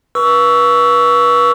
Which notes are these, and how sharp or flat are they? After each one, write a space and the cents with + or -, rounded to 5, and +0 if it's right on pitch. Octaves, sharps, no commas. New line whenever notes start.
B4 -30 C#6 +20 E6 +0